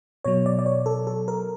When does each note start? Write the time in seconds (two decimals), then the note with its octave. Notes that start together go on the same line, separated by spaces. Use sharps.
0.24 B2 F#3 C#5
0.46 D5
0.59 D5
0.66 C#5
0.86 A4
1.07 A4
1.28 A#4